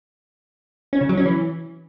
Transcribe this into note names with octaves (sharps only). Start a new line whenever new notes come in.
C#4
C#3
F#3
C#4
E3